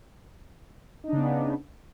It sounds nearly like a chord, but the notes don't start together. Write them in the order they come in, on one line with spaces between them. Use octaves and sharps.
D#4 D4 C#3 B3